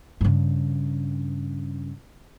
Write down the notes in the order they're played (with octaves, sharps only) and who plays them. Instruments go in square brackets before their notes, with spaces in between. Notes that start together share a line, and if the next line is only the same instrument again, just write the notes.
[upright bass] G2 C#3